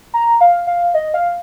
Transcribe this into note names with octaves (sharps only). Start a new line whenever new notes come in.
A#5
F5
F5
D#5
F5